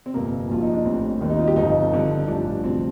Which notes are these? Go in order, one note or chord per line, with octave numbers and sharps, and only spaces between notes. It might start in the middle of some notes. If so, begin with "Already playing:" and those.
C4
G1 F2 C3 A#3
A#1 A#2 F3 F4
D#4
D4
A1 A2 G3 C4
D#2 D#3 G3 C4
D#4
F4
G4
G1 F2 D3 F3 D#4
F2 D3 G3
A1 G2 F3 D4
D2 C3 F3 C4